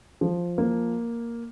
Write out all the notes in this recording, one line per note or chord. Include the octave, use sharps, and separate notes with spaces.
F3
A#3